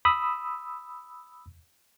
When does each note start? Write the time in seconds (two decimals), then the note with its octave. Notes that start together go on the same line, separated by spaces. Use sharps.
0.05 B5 D#6 E6